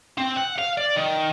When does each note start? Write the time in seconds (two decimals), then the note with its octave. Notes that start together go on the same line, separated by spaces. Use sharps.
0.18 C4
0.37 F#5
0.59 F5
0.78 D5
0.96 D#3